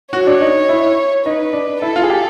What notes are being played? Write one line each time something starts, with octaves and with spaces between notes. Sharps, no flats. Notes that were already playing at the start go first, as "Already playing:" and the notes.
F#4 C#5
D4
D#4
E4
D#4 B4
D4
E4 A4
F4
G#4
G4